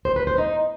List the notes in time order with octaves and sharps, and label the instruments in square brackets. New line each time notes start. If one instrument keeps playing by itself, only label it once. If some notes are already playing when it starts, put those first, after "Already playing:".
[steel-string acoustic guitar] C5
B4
C5
D#4